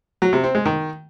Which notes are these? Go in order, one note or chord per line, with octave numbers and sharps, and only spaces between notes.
F#3
C3
C4
G#3
D#3